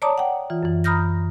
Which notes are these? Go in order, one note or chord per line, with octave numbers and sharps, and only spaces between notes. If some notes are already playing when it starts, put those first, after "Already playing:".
C#5 D5 A5 A#5 D6 D#6
F#5 G5
E3 F4
F#2 E3
A#5 B5 D#6 F6 G6 A#6